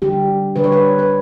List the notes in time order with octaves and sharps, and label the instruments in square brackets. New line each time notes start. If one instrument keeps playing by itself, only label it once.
[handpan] D3 G3 D4 G4
D3 G3 D4 B4
C#5
B4
B4